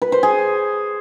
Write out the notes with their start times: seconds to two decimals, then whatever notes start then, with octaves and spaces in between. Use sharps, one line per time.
0.02 B4
0.12 C5
0.23 G#4